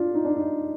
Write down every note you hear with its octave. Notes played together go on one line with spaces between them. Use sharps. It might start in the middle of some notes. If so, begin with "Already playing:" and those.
Already playing: D4 F4
D#4
D4
D#4